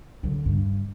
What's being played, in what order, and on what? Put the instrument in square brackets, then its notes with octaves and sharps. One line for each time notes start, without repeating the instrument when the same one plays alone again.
[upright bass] D3 F#3
G2